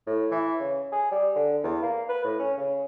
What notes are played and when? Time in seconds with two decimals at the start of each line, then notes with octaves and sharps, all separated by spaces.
0.06 A2
0.31 E3
0.60 C#3
0.92 G#4
1.12 G3
1.36 D3
1.64 E2
1.82 A#3
2.09 B4
2.24 A2
2.39 C#4
2.57 C#3